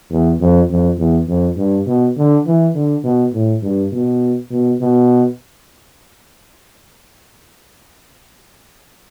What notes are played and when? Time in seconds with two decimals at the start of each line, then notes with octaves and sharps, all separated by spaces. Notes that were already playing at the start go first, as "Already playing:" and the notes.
0.10 E2
0.41 F2
0.70 F2
0.98 E2
1.28 F2
1.57 G2
1.87 B2
2.17 D3
2.46 E3
2.75 D3
3.04 B2
3.33 A2
3.62 G2
3.92 B2
4.51 B2
4.81 B2